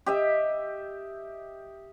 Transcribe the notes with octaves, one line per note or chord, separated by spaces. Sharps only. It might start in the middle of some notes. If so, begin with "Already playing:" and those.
G4 D#5 E5